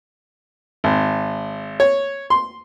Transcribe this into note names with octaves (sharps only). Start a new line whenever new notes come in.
G#1
C#5
C6